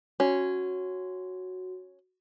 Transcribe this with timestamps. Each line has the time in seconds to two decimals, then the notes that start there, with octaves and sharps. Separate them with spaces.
0.20 C#4 F#4